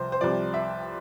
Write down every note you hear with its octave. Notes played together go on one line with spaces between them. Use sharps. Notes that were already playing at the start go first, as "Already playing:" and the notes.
Already playing: C2 C3 F3 C5
C5
C2 C3 F3 D5
E5